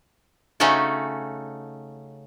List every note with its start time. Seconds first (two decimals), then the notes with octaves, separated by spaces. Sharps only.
0.60 C#3 A3 C#4 D#4 F#4 A4